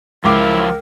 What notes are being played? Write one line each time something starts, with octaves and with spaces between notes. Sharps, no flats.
C#2 F3 F#3 E4 A#4 F5 D6